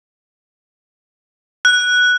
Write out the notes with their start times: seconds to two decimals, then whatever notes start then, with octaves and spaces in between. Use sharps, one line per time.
1.65 F#6